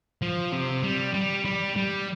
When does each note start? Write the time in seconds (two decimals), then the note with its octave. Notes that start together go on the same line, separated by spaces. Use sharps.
0.22 F3
0.52 C3
0.83 G3
1.14 G3
1.45 G3
1.76 G3